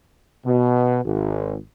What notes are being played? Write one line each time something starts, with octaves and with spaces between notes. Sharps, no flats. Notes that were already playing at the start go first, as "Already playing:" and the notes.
B2
G#1